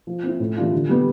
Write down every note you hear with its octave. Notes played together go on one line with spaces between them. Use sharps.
F3
C4 E4
A2
E3 G3 D4 F4
D3
G3 B3